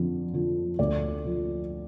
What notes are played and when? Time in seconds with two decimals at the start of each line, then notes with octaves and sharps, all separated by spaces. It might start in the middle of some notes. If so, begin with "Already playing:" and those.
Already playing: F2 D3
0.34 D3 F3
0.79 D2 D5
1.24 D3 F3